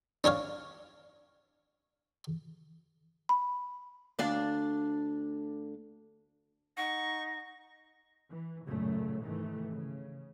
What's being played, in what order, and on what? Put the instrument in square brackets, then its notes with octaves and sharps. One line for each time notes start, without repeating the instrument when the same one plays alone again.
[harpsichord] C#4 D4 C#5 F5
[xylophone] B5
[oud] D2 D4 F5
[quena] D#4 [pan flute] F#5 [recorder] C#6 [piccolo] A#6
[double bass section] E3
A1 F#2 A#2 C#3 A3
G#2 C3 D#3 E3 A3
C#3